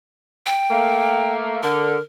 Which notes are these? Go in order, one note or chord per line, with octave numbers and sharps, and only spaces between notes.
G5
A3 A#3
D3 A#4